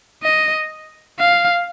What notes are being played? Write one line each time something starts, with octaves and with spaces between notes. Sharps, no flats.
D#5
F5